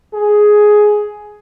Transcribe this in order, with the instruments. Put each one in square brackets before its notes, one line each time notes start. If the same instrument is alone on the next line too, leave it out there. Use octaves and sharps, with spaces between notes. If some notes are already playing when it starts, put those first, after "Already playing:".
[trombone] G#4